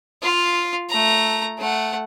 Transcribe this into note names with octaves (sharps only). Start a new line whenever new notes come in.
F4 F5
A3 A#5
A3 F#5